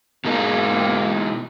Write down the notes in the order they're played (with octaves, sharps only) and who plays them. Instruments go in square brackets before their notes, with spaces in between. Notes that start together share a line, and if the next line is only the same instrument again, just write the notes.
[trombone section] G#2 A#3 [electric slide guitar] B2 G#3 D#4